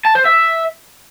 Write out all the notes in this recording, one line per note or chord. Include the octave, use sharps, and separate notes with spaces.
A5
C5
E5